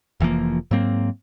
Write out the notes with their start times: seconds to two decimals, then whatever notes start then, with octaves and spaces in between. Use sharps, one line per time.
0.20 F1 E3 F3 A#3
0.71 G#2 F#3 A#3 C4